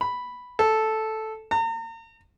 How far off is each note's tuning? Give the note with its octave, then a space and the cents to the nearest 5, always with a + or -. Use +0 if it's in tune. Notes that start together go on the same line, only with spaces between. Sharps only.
B5 +0
A4 -5
A#5 -40